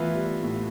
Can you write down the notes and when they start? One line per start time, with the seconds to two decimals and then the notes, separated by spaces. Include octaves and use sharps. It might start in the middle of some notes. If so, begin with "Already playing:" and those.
Already playing: E3 A3 B3 F4 B4 E5
0.15 G3
0.43 A2